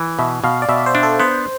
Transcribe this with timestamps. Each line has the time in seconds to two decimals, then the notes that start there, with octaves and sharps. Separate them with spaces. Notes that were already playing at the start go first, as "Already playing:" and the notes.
Already playing: E3
0.19 B2 E5
0.44 B2 F5
0.62 D5
0.69 B2 E5
0.86 C5
0.95 D4
1.03 A4
1.20 B3 C5